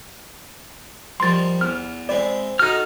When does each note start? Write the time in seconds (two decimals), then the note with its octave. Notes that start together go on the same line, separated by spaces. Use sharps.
1.20 D#3 F3 G3 C6 A6
1.61 E2 F6
2.09 G#3 C4 E4 D5
2.59 D#4 F#4 A4 F6